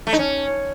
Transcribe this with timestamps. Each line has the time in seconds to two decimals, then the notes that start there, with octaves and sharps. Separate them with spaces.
0.07 A3
0.13 D#4
0.19 C#4